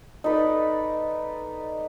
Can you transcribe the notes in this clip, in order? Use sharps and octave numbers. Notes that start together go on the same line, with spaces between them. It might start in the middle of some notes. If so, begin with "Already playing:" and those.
D#4 A4 B4 D5